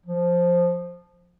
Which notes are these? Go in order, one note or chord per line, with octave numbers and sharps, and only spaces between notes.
F3